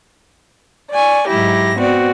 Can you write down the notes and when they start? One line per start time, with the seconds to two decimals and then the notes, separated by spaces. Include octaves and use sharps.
0.91 D5 G#5 C#6
1.27 G#2 F#3 E4 G4 A#6
1.78 B3 C4 F#4 D5